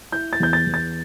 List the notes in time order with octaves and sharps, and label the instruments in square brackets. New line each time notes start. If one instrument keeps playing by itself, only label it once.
[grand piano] E4 G6
A6
E2 G6
A6
E2
A6